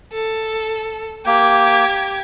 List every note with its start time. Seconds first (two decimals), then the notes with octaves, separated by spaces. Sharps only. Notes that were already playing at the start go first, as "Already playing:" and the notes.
0.13 A4
1.26 A#3 G4 G#6